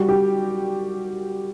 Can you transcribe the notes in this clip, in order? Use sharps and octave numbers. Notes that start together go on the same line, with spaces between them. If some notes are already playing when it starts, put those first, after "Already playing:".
Already playing: G3 F#4
G4